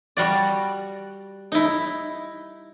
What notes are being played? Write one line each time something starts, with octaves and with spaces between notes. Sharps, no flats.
G3 F#4 D5
D#4 E4